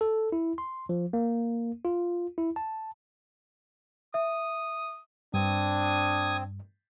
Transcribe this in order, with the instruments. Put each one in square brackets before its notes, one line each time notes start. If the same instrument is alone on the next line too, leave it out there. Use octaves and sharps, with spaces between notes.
[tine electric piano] A4
E4
C6
F3
A#3
F4
E4
A5
[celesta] E5 [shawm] D#6
[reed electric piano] G2 [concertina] C4 [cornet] D4 [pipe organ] D#6 G#6